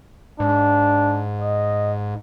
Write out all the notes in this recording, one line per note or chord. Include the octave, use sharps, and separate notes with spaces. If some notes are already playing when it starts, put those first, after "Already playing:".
G#2 D4
D#5